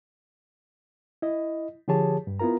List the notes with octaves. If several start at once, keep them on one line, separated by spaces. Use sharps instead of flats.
E4 D#5
D3 F3 G4 G#4 C#5 A5
G2
B3 E4 F4 A#4 A#5